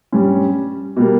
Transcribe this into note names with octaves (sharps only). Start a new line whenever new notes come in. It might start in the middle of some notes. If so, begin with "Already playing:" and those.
G2 G3 C#4
B2 G3 A#3